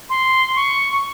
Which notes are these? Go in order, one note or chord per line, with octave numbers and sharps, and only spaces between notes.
C6
C#6